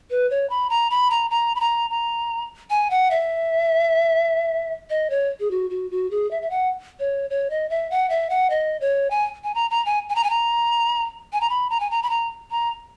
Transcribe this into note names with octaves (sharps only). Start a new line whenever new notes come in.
B4
C#5
B5
A#5
B5
A#5
A#5
B5
A#5
A#5
G#5
F#5
E5
D#5
C#5
G#4
F#4
F#4
F#4
G#4
E5
E5
F#5
C#5
C#5
D#5
E5
F#5
E5
F#5
D#5
C#5
G#5
G#5
A#5
A#5
G#5
G#5
A#5
G#5
A#5
G#5
A#5
B5
A#5
G#5
A#5
B5
A#5
A#5